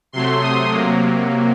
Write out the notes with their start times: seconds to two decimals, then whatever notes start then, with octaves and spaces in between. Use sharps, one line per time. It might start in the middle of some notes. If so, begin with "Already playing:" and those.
0.12 C3 F#3 A3 C6
0.41 D#6
0.69 C3 F#3 A#3